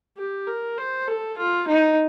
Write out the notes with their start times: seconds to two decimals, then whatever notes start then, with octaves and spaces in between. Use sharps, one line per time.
0.18 G4
0.47 A#4
0.78 C5
1.08 A4
1.38 F4
1.68 D#4